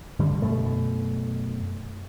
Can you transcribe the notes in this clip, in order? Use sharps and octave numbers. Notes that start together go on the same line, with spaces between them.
G2 D3 G3
F#2 B2 A3